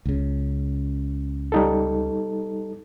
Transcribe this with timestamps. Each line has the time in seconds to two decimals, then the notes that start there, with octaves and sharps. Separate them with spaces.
0.06 C#2 C#3
1.52 G3 D#4 A4